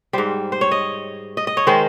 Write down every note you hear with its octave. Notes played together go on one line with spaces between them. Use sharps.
G#2 G3 C5
C5
C#5
D#5
D#5
D#5
C#5
D#3 G#3 C5